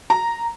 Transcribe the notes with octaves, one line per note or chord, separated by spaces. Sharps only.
A#5